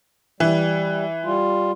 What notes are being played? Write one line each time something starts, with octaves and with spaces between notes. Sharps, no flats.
E3 G3
G3 F4